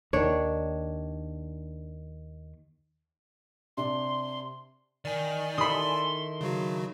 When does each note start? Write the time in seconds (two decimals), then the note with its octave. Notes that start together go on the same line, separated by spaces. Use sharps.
0.13 D#2 D#3 D4 C#5
3.77 C3 D4 C6
5.05 D#3 D5 G#5
5.58 D#3 E4 A4 B5 C6 D#6
6.41 C#3 F#3 F#4